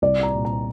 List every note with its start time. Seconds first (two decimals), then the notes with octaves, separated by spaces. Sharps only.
0.02 C2 D5
0.23 A#5
0.35 A#2
0.45 A#5